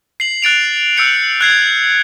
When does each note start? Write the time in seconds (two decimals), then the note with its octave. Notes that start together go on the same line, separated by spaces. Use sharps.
0.20 C7 F#7
0.42 F#6 A6 D7 F7
0.97 E6 G6 C#7 D7
1.41 F#6 G#6 C7